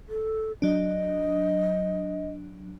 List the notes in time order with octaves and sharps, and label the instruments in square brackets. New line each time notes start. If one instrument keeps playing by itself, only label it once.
[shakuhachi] A4
[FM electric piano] F#3 D4 [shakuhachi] D#5